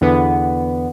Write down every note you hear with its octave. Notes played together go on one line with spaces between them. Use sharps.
E2 D3 B3